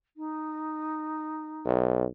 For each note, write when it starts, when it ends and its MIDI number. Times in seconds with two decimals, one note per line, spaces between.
0.16 1.95 63
1.66 2.05 35